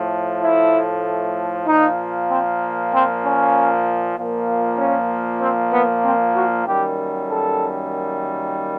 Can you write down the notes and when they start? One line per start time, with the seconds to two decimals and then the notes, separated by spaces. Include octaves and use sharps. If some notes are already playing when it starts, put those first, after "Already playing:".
Already playing: A2 F3 A3
0.41 E4
1.66 A#2 F3 A#3 D#4
2.28 C4
2.91 C4
3.22 C#4
4.16 A#2 F3 A#3
4.78 C#4
5.40 C4
5.72 B3
6.03 C4
6.35 F#4
6.65 F#2 D#3 G3 A#3 G4
7.27 A4